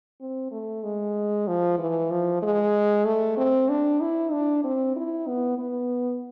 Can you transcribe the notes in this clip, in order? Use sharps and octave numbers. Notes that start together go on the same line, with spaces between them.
C4
A3
G#3
F3
E3
F3
G#3
A3
C4
D4
E4
D4
C4
E4
B3
B3